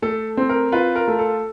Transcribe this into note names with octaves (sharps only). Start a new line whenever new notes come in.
A3 A4
C4
A#4
F4 B4
A#4
A3
A4